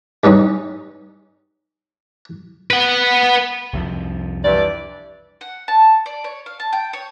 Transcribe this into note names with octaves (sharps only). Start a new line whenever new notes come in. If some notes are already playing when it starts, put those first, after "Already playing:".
G2 G3 C#4 D#4
B4 F#5
C2 F2 F3
G2 E3 D5
F#5
A5
D5
C#5
F5
A5
G5
C#5